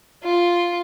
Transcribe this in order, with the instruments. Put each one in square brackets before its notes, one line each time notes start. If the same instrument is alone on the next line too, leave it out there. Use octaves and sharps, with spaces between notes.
[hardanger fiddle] F4